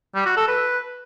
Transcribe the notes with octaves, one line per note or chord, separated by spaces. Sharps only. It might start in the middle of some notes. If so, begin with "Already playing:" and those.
G3
F#4
A4
B4